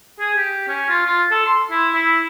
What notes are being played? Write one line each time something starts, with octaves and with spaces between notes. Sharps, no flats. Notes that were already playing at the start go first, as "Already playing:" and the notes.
G#4
G4
C#4
F4
F4
A4
C6
E4
E4